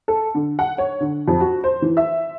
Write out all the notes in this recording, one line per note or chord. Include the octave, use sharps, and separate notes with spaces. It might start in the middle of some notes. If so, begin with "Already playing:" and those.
A4
D3
F#5
C#5
D3
F2
F#4
C5
E3
E5